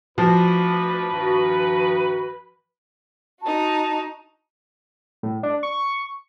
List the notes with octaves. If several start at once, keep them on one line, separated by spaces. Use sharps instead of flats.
D2 F3 D4 F#4 B4
G2 D#3 F#4
D#4 F#4 A5
A2
D4
C#6